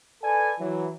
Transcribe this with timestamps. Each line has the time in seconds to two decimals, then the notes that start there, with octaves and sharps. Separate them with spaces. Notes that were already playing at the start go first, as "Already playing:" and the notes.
0.22 A4 B4 D5 G#5
0.59 E3 F#3 E4